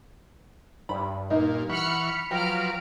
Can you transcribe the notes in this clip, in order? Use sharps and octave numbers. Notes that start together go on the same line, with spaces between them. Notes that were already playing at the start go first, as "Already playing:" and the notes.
G2 B5
A#2 D#4
E3 F#5 B5 C#6 F6 C#7
F3 F#3 B4 G5 A#5 F6 D7